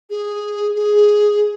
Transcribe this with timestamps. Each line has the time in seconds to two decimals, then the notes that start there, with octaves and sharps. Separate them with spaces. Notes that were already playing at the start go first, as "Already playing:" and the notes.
0.10 G#4
0.76 G#4